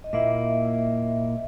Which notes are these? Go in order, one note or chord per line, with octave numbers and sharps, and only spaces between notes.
D#5
A#2 A#3 E4 E5